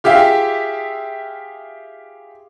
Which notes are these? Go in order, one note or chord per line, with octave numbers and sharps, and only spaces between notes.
F4 G4 G#4 E5 F5